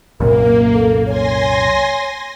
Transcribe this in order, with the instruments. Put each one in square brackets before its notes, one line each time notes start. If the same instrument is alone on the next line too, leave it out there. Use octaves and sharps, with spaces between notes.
[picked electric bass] C2 F#2 A#2 [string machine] A#3 [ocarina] A#4
[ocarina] A4
[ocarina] C#5 [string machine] G#5 C6 A#6